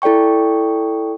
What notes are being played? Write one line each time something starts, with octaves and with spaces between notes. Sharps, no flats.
E4 A4 D5 G5 C#6